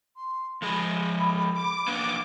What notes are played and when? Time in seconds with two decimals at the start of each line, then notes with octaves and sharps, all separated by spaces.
0.16 C6
0.62 F3 G#3 G#4 B5
1.54 D6
1.88 A#3 B3 D4